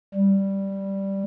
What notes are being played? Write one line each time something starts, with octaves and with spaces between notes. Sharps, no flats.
G3